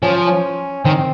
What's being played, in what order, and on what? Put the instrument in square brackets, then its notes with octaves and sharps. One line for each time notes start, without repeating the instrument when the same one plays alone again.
[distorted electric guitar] F3 [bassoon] C#4
[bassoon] C#4
[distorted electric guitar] D#3 [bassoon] C4